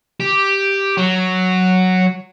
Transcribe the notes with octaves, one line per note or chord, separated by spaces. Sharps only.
G4
F#3